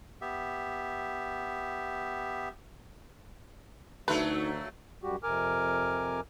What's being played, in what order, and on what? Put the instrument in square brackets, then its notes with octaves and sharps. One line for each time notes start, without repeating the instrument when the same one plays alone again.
[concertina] B3 G4 E5
[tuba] D2 [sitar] F#3 A3 A#3 [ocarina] D#4 [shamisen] B4
[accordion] F#2 G3 F#4 G4
F2 C3 A#4 G#5 D6 F6